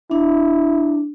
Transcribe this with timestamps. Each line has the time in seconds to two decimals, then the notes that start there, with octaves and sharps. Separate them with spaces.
0.11 D4 E4